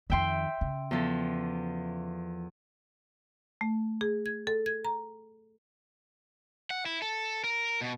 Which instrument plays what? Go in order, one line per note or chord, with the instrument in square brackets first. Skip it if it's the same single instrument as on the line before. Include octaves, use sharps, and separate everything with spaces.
[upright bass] F2 D#3 [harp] E5 G5 C6
[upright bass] C#3
[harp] E2 F3 A4
[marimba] A3
G#4
G#6
A4
G#6
A#5
[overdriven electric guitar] F#5
E4
A4
A#4
B2